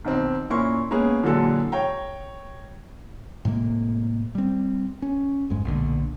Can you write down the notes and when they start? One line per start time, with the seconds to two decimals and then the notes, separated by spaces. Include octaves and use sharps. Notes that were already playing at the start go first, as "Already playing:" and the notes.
0.05 B1 D#3 C4
0.50 A#2 C#4 E4 A#4 C6 C#6
0.91 G#3 A#3 B3 C#4 G#4
1.23 A#2 D3 E3 F#3 G#3 A4
1.72 C#5 G5 A#5
3.45 A2 C3 G#3 A#3
4.35 G3 C4
5.02 C#4
5.50 G#1 F2 G#2 G#3
5.65 B1 A#2 D3